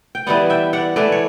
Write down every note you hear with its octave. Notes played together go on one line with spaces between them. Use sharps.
G5
E3 G3 B3 D5 F#5
E5 G5
D5 F#5
E3 A3 D4 B4 D5
C#5